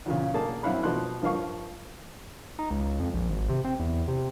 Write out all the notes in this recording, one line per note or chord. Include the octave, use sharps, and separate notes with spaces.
E2 A#2 C#3
B1 A#3 G#4 A5
F#2 C4 E4 F5 F#5 B5
B2 F3 B3 C6 F#6
G2 F3 A#4 F5 C#6
D#4
C#2
F2
A#1
G#1
C3
C4
E2
C3